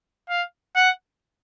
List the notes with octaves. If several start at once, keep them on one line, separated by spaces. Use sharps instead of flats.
F5
F#5